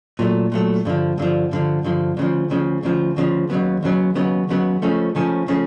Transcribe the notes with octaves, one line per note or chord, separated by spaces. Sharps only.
A#2 F#3 A3
A#2 F#3 A3
G2 D3 F3
G2 D3 F3
G2 D3 F3
G2 D3 F3
D2 C#3 F3
D2 C#3 F3
D2 C#3 F3
D2 C#3 F3
D#2 C#3 F#3 B3
D#2 C#3 F#3 B3
D#2 C#3 F#3 B3
D#2 C#3 F#3 B3
C#2 C#3 F3 A3 C#4
C#2 C#3 F3 A3 C#4
C#3 F3 A3 C#4